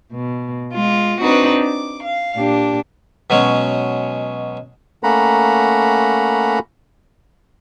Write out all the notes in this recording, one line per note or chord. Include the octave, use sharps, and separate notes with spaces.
B2
G#3 F4
C4 D4 D#4 F#4 B4
D6
F5
A#2 D4 G4
B2 F#3 G#3 C#4
A3 A#3 C#4 F#5 A#5 B5